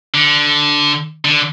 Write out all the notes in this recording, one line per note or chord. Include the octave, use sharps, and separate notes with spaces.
D3
D3